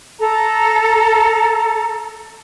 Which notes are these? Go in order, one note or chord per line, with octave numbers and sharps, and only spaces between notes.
A4 A#5